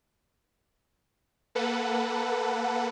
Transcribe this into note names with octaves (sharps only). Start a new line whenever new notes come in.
A#3 A4 B4 F#5